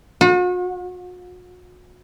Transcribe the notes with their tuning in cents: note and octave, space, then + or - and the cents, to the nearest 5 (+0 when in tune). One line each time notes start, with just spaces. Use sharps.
F#4 -45